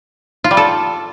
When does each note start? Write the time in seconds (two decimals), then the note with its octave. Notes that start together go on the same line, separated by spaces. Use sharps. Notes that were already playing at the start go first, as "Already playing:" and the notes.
0.44 F4
0.51 G3
0.57 A4